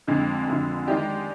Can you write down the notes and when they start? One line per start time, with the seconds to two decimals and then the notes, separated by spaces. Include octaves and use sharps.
0.07 F2 D3 G#3
0.47 F2 D3 G#3
0.87 D#3 G#3 D#4 G4 D5